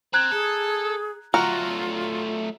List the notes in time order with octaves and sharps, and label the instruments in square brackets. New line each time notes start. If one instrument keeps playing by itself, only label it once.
[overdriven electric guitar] C4 [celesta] A#5 F#6 G#6
[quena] G#4 [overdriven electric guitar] A4
[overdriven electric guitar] F#3 A3 [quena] F4 [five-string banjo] F#4 A#4